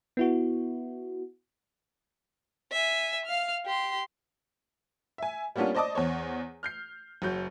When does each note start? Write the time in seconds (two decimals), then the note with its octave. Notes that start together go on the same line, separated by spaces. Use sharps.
0.17 B3 E4 F#4
2.72 E5 G#5
3.25 F5 F6
3.66 G4 C6
5.18 E5 G#5
5.56 G3 A#3 B3 C#4 D4 F4
5.75 C5 D5 D#5 A5 D6 D#6
5.95 E2 C5 C#5
6.63 F6 G6 C7
7.22 F#1 F#3 G6